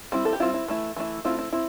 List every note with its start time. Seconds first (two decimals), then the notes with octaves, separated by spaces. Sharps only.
0.12 G3 C4 E4
0.25 A4
0.33 G4
0.40 G3 C4 E4 F4
0.54 E4
0.68 E3 A3 E4
0.96 E3 A3 E4
1.24 A3 C4 E4 F4
1.39 E4
1.52 C4 E4